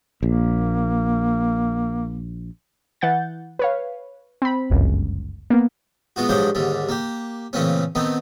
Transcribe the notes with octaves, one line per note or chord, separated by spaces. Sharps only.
A#1 A#3
E3 F#5 G6 A6
B4 C#5 F5
C4 B5
G1 C#2 F#2
A#3 B3
G#3 B3 F4 F#4
G2 F3 F#3 G#3 D4 G5
D#2 G#2 D3 G3
A#3 G4
A#2 C#3 E3 A3 C4 C#4
D#3 A3 B3 C4 D#4